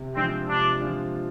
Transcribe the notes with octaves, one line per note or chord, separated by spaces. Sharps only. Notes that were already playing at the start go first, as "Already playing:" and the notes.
Already playing: C3
F3 G#3 C4 D4 F4
C3 D4
F3 G#3 D4 F4